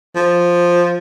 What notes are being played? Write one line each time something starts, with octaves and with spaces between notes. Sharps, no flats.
F3